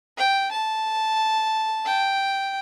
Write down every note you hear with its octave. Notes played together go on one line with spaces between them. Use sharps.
G5
A5
G5